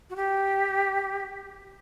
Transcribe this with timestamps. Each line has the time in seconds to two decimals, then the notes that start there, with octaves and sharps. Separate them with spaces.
0.10 F#4
0.16 G4